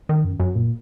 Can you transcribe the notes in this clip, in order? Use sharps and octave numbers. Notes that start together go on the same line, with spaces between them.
D#3
F#2
F#2
A#2